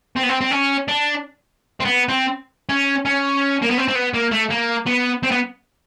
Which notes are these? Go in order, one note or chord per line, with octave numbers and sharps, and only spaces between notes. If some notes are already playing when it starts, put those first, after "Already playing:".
C4
B3
C4
C4
C#4
D4
C4
B3
C4
C#4
C#4
A#3
B3
C4
C4
B3
A#3
A3
A#3
B3
C4
B3